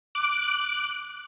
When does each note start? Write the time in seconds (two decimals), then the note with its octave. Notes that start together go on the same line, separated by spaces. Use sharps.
0.15 D6 F#6